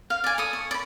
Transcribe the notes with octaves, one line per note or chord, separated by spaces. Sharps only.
F5
D5 G#5
A4 D#6
C#6
D5 B5